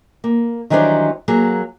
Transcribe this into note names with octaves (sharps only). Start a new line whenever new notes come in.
A#3
D#3 E3 F#3 G3 D4 C5
F#3 A#3 G#4